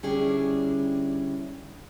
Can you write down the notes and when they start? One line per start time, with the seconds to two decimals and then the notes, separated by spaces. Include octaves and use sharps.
0.03 D3 G3 C#4 D4 E4 G#4